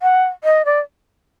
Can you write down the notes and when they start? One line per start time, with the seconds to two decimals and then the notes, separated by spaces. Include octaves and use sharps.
0.02 F#5
0.44 D#5
0.65 D5